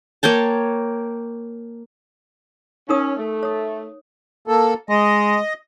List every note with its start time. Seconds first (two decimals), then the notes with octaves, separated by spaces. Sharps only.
0.23 A#3 C#5 G5 A5
2.89 C#4 D#4 A#4 D#6
3.17 A3
3.43 C#5 D#6
4.48 A#3 A4
4.89 G#3 D#5